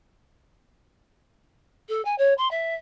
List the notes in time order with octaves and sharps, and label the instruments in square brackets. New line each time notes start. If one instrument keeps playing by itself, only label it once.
[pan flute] A4
G#5
C#5
C6
E5